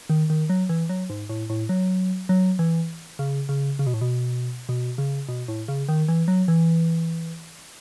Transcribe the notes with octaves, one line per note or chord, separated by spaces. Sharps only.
D#3
D#3
F#3
E3
F#3
G#2
A2
A2
F#3
F#3
E3
C#3
C#3
C#3
B2
A2
B2
B2
C#3
B2
A2
C#3
D#3
E3
F#3
E3